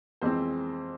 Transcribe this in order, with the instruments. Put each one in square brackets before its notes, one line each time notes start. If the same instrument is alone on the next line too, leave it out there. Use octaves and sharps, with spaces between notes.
[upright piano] F2 E3 G#3 C4 C5